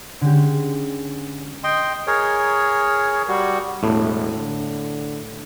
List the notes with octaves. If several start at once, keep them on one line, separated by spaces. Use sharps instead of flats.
D3 G#3 C#4 G4
D#5 G5 C6
G#4 A#4 C#5
G3 F#4
E1 A2
D3